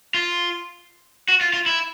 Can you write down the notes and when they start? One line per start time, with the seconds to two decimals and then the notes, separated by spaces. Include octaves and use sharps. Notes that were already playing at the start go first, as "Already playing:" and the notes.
0.14 F4
1.29 F#4
1.41 F4
1.53 F4
1.66 E4